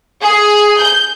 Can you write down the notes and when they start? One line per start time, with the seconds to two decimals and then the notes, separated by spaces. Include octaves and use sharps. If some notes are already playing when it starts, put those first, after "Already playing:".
0.20 G#4
0.78 G6